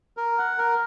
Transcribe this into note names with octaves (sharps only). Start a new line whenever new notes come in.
A#4
F#5
A#4